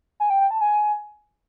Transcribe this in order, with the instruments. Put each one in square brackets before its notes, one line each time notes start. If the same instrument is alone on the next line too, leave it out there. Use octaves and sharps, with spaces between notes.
[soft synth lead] G#5
G5
G5
A5
G#5